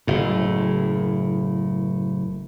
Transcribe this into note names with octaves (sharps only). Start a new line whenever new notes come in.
F#1 A2